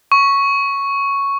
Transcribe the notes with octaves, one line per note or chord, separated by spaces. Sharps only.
C#6